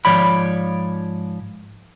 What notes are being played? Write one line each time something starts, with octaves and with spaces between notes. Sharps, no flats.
G#2 F3 C#5 D5 B5